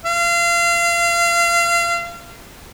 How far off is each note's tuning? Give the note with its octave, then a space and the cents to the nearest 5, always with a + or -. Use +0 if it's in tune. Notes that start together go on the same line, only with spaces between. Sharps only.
F5 -30